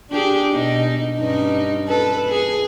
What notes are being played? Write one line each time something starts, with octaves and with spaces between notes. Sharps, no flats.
D4 G4 G#4
B2 D#4
G2 C#4 D#4
A4 B4
G#4